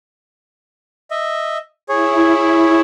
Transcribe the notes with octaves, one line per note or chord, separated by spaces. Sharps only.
D#5 E5
E4 G#4 C#5